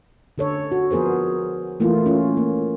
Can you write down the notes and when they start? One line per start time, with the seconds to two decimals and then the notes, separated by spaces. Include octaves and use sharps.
0.38 D3 A4 C#5
0.72 F#4
0.91 F3 B3 G#4 A#4 C5
1.80 E3 A3 A#3 E4 F4
2.06 C#4 F4
2.37 A#3